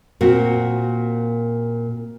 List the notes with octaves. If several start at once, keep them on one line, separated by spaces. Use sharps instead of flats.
A#2 C4 F#4